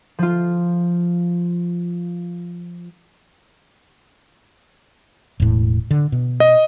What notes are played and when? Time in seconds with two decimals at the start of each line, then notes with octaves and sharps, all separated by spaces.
0.19 F3 F4
5.40 E1 A2
5.91 D3
6.12 B2
6.40 D#5